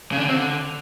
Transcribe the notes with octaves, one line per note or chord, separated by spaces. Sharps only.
C#3
D4
D3
C4
D3